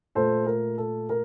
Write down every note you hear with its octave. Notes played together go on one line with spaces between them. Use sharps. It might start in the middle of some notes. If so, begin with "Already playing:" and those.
A#2 A3 A4 C5
A#4
A4
A#4